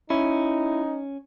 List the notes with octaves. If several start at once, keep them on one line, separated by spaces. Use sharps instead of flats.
C#4 D#4 E4